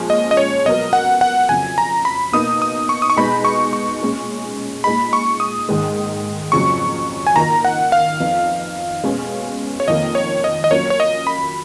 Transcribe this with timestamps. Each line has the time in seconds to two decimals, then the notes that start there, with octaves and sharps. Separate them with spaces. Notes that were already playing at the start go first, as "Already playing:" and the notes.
Already playing: A#2 F3 G#3 C#4
0.10 D#5
0.31 D#5
0.37 C#5
0.65 B2 F#3 B3 F#4 A#4 D#5
0.93 F#5
1.21 F#5
1.49 F2 C#3 F#3 G#5
1.78 A#5
2.05 B5
2.33 B2 A#3 D#4 D#6
2.62 D#6
2.89 C#6
3.02 D#6
3.10 C#6
3.16 B2 G#3 D#4 G#4 B5
3.45 C#6
3.73 C#6
4.01 A#2 G#3 C#4 G#4
4.84 A#2 G#3 D#4 G#4 D#5 B5
5.13 C#6
5.40 D#6
5.69 G#2 D#3 G#3
6.52 F2 C#3 F#3 C#6
7.27 G#5
7.36 D#3 A#3 F4 A#4 D#5 A#5
7.65 F#5
7.92 F5
8.20 F2 F3 B3 D#4
9.04 B2 G#3 C#4
9.80 C#5
9.88 F2 D#3 A#3 D#5
10.15 C#5
10.44 D#5
10.64 D#5
10.71 F#3 A#3 C#4 F4 A#4 C#5
10.90 C#5
11.00 D#5
11.27 B5